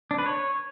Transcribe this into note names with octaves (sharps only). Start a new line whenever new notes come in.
D4
B4
C#5